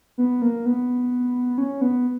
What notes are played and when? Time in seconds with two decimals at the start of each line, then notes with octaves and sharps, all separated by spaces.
0.18 B3
0.42 A#3
0.66 B3
1.58 C#4
1.81 B3